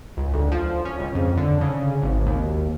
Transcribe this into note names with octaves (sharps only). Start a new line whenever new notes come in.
C#2
D2
F3
C#4
C#2
F2
D3
C#3
G#1
D#2